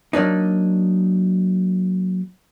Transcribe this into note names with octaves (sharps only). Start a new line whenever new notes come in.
F#3 A#3 D4 D#4